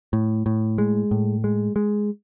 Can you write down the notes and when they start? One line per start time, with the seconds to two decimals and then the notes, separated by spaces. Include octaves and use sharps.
0.13 A2
0.46 A2
0.78 G#3
1.11 A2
1.44 G#3
1.76 G#3